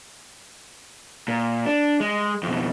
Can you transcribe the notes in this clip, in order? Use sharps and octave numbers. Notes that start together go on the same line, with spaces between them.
A#2
D4
G#3
F2 B2